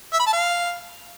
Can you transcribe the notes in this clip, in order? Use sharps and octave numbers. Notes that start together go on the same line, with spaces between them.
E5
B5
A5
F5